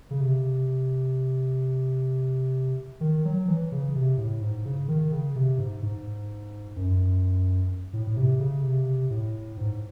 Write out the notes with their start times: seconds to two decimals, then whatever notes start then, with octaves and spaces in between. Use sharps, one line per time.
0.11 C#3
0.20 C3
3.01 D#3
3.25 F#3
3.48 E3
3.72 C#3
3.95 C3
4.18 A2
4.42 G#2
4.66 C#3
4.88 D#3
5.12 C#3
5.35 C3
5.58 G#2
5.83 G#2
6.76 F#2
7.93 A2
8.07 A2
8.16 C3
8.40 C#3
8.63 C3
9.10 A2
9.57 G#2